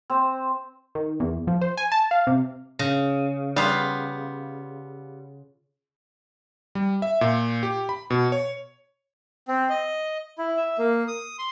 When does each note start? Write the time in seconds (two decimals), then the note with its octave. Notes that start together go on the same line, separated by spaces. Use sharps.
0.10 C4
0.95 D#3
1.20 E2
1.47 F3
1.61 C5
1.77 G#5
1.92 A5
2.11 F5
2.27 C3
2.79 C#3
3.56 G3 B3 F4 F5
6.75 G3
7.02 E5
7.21 A#2
7.63 G4
7.89 B5
8.10 B2
8.32 C#5
9.48 C4
9.69 D#5
10.38 E4
10.57 E5
10.78 A#3
11.08 D#6
11.39 C6